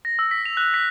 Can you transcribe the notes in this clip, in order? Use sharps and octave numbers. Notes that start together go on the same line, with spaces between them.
A#6
E6
B6
F7
F#6
B6